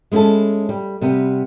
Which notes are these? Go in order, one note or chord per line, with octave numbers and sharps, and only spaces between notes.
G#3 B3 C#4 E4 A4
G3
C3 G3 B3